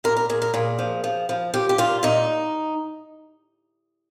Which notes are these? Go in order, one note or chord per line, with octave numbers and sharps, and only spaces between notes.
A#2 A#4
A#4
A#2 G#4
A#4
A#2 G#4
F3
F3
F3
F3 G4
G4
A#2 F4
A#2 D#4